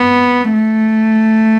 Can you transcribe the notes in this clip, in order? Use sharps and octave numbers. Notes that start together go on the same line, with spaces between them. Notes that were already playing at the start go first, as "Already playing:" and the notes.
Already playing: B3
A3